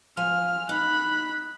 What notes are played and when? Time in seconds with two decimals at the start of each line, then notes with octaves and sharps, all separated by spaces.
0.17 F3 G#5 F6
0.69 D#4 B5 F#6